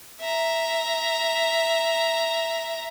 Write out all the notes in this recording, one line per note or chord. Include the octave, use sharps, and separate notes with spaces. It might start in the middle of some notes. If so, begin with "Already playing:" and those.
E5 A#5